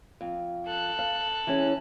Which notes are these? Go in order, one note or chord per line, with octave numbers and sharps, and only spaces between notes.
F2
A4 F#6
F5
E3 C#4 G#4